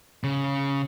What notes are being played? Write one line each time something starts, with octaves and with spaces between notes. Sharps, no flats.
C#3